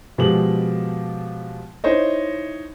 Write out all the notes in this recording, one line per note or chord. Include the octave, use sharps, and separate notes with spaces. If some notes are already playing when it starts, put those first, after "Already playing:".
B2 F3 G#3 G4 F#7
D#4 E4 C5 C#5 D#5